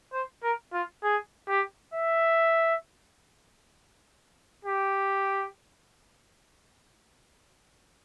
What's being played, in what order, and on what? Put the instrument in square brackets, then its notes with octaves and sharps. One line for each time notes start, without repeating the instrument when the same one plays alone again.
[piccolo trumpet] C5
A#4
F4
G#4
G4
E5
G4